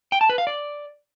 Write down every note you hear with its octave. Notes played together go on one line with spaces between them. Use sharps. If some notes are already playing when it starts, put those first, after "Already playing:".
G5
A5
B4
F5
D5